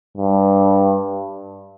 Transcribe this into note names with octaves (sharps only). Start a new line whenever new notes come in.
G2